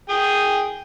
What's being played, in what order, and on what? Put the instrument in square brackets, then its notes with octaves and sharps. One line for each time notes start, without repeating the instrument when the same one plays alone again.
[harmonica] G#4 G5 D#6